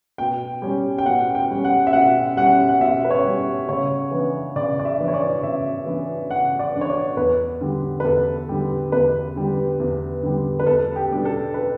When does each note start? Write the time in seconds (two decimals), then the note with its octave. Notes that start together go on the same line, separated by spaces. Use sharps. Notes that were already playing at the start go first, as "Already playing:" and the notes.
0.18 B2 G5
0.62 G3 C#4
0.98 G5
1.06 B2 F#5
1.35 G5
1.50 G3 C#4
1.65 F#5
1.87 E5
1.93 B2 F#5
2.37 G3 C#4 F#5
2.69 F#5
2.80 B2 E5
3.05 B4
3.11 C#5
3.24 G3 C#4
3.69 C#3 C#5
4.11 E3 B3 D4
4.56 C#3 D5
4.79 D5
4.85 E5
4.99 E3 B3 D4
5.08 C#5
5.14 D5
5.42 C#3 E5
5.86 E3 B3 D4
6.30 C#3 F#5
6.59 D5
6.74 E3 B3 D4
6.81 C#5
6.89 D5
7.17 E2 B4
7.61 D3 G3
8.00 B4
8.05 E2 A4
8.49 D3 G3
8.92 E2 B4
9.36 D3 G3
9.80 E2
10.23 D3 G3
10.59 B4
10.67 E2 A4
10.96 G4
11.11 B2 G3 B3 D4
11.25 A4
11.54 B4